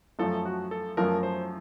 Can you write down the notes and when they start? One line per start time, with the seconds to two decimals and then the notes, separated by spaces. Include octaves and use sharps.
0.19 F#2 F3 A3 A4
0.45 F#4
0.71 A4
0.97 F#2 F3 A3 A#4
1.23 C5